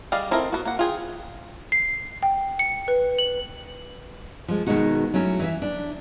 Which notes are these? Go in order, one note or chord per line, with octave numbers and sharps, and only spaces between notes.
G3 G#4 D5 D#5 F5
C4 E4 A4 A#4 D#5
B3 F#4
A#3 F#5
F4 G#4 G5
C7
G5
C#7
B4
F#7
F3 G#3
B2 D#3 G#3 D#4 F#4
F#3 A3 C#4 E4
E3 D#5 E5
D4